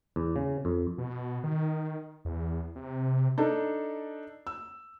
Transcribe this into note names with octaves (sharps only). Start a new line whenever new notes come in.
E2
C#3
F2
B2
D#3
E2
C3
D4 D#4 A4
E6